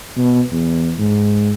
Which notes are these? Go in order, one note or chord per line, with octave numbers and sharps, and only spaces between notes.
B2
E2
G#2